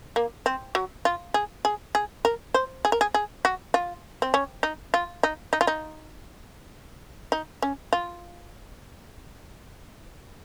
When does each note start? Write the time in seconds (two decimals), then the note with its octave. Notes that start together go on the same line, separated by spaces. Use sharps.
0.16 A#3
0.46 C4
0.75 F#3
1.05 F4
1.34 G#4
1.65 G#4
1.95 G#4
2.25 A#4
2.54 C5
2.85 G#4
2.92 A#4
3.01 G#4
3.14 G#4
3.45 F#4
3.74 F4
4.22 C4
4.34 C#4
4.63 D#4
4.94 F4
5.23 D#4
5.53 D#4
5.61 F4
5.67 D#4
7.32 D#4
7.62 C#4
7.93 F4